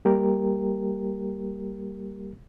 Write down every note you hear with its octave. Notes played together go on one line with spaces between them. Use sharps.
G3 A#3 G4 A#4